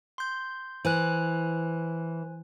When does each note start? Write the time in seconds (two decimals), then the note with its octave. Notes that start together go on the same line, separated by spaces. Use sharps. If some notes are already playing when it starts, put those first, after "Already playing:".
0.18 C6 G6
0.85 E3 C5 G#5 F#6